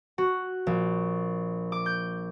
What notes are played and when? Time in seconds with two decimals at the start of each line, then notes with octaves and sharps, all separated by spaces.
0.18 F#4
0.67 A#1
1.72 D6
1.86 G6